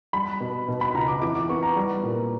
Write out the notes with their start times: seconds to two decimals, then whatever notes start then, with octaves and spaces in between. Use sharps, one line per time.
0.13 G3 B5
0.40 B2
0.68 B2
0.81 B5
0.94 C#2 A#5
1.08 D6
1.22 E3 D6
1.35 D6
1.49 B3 C#6
1.63 A#5
1.76 G3
2.03 A#2